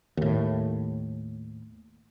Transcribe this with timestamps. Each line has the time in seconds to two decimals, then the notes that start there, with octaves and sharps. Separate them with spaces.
0.17 D#2 A2